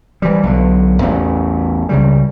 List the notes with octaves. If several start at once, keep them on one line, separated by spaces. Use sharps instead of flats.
E3 G3
B1 D3
A1 E2 A3
C#2 C#3 G3